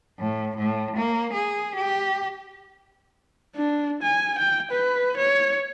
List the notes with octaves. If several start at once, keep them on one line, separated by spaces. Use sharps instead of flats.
A2
A2
A#3
G#4
G4
D4
G#5
G5
B4
C#5